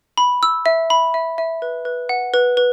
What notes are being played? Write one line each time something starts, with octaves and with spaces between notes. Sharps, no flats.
B5
E6
E5
B5
E5
E5
B4
B4
F#5
B4
B4